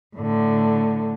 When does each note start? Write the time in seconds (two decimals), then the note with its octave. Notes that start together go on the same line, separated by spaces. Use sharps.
0.17 A2 D3